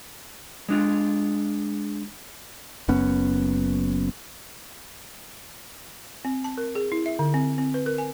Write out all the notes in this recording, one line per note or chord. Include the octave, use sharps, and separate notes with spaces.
G#3 D4 F4
F#1 F#2 B3 C#4
C4
A5
A#4
G#4
E4
E5
D3
C4
C4
B4
A#4
G#5